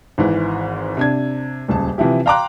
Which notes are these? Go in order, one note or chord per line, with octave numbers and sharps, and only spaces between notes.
G#1 G#2 E3
C3 D4 G#6
D#1 C#2 A5
C3 E3 F3 E4 G4
F5 G5 A#5 C6 D6 F#6